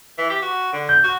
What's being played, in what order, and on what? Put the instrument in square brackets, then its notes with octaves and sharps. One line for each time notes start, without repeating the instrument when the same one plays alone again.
[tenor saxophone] E3
G4
F#4
D3
[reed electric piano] G6
[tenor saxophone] F#4